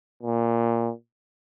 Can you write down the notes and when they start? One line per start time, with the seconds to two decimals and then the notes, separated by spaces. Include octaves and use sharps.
0.23 A#2